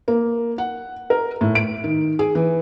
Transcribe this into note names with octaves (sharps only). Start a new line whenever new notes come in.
A#3
F#5
A#4
A2
D7
D#3
G#4
E3